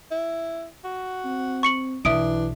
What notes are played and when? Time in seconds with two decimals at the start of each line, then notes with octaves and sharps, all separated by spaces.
0.11 E4
0.84 F#4
1.24 C4
1.63 C#6 C#7 F#7
2.05 B1 E3 D4 E5 D#6 D7